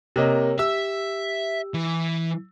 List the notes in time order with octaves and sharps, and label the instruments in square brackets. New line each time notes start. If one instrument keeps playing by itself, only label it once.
[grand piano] C3 A#3 D#5 [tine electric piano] G4 A#4 C#5
[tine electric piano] G4 [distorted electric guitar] E5 [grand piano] E6
[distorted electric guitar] E3